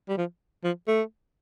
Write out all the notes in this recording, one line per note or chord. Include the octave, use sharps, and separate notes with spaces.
G3
F3
F3
A3